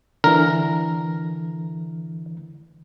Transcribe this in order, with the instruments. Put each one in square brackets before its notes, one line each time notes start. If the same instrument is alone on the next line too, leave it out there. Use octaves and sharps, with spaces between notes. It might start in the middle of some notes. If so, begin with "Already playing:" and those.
[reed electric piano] D3 E3 [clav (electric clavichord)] A#4